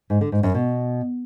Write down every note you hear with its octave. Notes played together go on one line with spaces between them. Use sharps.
G#2
D3
G#2
F#2
B2